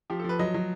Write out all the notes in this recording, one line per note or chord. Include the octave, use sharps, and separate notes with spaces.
F3 G4
A4
F3 B4
F#3 D#5
F#3